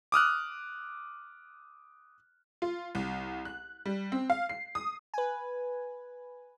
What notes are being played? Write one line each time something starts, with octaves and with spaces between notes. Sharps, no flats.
D6 D#6 F6 F#6
F4
C2
F#6
G3
C4
F5
C7
D#6
B4 G#5